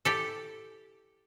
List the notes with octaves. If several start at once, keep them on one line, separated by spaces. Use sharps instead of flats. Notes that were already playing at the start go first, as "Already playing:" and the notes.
E4 G4 A4